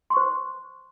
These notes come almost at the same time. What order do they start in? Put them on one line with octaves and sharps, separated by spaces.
C6 C#6 C5